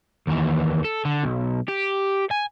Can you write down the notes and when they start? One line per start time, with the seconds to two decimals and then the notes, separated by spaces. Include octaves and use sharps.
0.27 D#2 E3
0.84 A4
1.05 D3
1.23 B1
1.68 G4
2.31 G#5